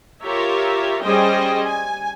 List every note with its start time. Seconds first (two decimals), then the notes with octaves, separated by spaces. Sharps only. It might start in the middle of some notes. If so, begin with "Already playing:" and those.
0.24 F4 G4 A#4 C#5 E5
1.04 G3 C#4 G#4 C5 D#5 G5
1.65 G#5